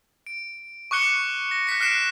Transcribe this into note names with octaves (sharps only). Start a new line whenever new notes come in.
D7
C#6 D6 F#6 C#7 G7
A#6
F#6 A#6 B6 C#7
F6 F#6 B6 C7 D7 E7